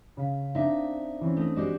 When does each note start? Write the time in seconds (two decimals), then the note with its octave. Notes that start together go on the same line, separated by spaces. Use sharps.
0.17 C#3 F5 B6
0.55 C4 D4 D#4 E5
1.21 E3 C4 C#4
1.37 A3 D#6 A#6
1.56 G#3 F#4 G4 D5 B6 E7